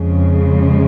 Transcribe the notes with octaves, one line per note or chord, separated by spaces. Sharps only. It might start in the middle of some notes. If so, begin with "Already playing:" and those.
Already playing: F2 C#3 G#3